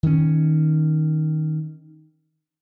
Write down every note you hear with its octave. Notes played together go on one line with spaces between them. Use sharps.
D#3 C#4